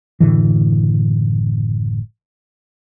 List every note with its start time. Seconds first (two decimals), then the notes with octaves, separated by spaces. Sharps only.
0.20 F#1 A2 D3 E3